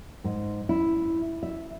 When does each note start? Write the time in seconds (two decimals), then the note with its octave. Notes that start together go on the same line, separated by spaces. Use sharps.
0.24 G#2
0.69 E4
1.43 E5